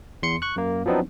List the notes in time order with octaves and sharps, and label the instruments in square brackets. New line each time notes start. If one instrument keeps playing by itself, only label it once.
[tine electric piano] E2 C6 C#7
C#6 F#6
F#2 A#3
F3 F#3 B3 C4 D4 D#4